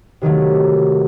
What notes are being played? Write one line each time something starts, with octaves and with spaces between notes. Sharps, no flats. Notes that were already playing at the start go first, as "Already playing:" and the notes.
C3 D#3 F#3 A3